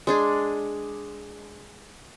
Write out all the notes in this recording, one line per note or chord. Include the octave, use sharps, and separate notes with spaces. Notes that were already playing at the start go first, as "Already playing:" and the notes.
G#3 D4 G#4